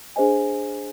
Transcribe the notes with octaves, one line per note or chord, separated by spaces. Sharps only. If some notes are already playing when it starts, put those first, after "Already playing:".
D4 G#4 C5 D#5 G#5